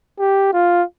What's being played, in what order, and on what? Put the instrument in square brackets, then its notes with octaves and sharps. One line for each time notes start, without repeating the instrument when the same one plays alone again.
[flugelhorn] G4
F4